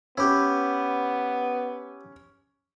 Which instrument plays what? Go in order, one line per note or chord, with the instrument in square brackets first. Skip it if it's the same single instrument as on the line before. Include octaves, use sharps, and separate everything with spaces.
[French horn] B3 [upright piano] C#4 [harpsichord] E4 G4